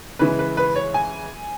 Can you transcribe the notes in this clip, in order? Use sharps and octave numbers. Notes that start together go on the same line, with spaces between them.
C#3 E3 G#3 B4
B4
B4
C#5
G#5